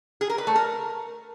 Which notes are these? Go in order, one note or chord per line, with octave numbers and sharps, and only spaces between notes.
G#4
A#4
B4
A3
A#4